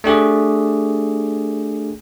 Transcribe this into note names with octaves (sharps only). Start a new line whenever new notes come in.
A3 D4 G4 G#4